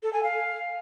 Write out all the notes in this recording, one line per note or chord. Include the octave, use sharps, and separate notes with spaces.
A4
G#5
F5